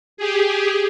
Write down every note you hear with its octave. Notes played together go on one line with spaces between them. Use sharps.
G4 G#4